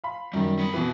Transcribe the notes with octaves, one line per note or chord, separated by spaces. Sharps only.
F5 B5 C6
F#2 D#3 G3
C4 B5
B2 E3